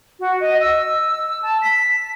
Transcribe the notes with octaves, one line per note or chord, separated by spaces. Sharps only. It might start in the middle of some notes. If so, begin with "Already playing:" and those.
F#4
D#5
E6
A5
B6